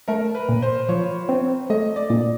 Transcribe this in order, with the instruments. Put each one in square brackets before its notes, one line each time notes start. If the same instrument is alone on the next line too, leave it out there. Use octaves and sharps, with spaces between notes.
[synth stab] A3 [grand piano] A#4
[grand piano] B4
[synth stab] A#2
[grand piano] C5
[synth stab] F3 [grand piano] C#5
[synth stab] C4
[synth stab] A3 [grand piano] D#5
[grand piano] D5
[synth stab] A#2